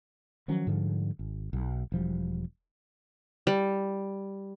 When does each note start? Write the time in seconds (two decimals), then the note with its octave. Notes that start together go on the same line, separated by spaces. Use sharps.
0.48 D#3 F3 F#3 C#4
0.67 G#2 D3 F3 G3
1.19 G#1
1.53 B1
1.92 E1 F3 G3
3.47 G3